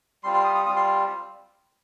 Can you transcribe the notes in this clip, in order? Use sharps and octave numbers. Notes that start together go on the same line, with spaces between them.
G3 C4 F4 C6
C6
D#6
D#6
G3 C4 F4 D#6
C6